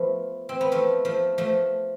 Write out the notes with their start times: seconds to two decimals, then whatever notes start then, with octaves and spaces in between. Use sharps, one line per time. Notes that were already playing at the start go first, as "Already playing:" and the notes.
Already playing: F3 A3 B3
0.49 C4
0.61 B3
0.72 F3 A3
1.05 F3 A3
1.38 F3 A3